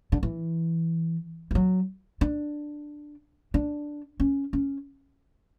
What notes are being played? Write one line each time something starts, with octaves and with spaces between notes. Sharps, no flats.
D3
E3
E3
F#3
D4
D4
C#4
C#4